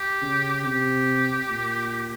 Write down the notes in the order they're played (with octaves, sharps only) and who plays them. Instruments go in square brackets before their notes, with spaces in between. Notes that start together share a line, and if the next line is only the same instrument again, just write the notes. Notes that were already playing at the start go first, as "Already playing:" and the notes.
Already playing: [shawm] G4
[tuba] C#3
[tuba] C3 [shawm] G4
[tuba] A#2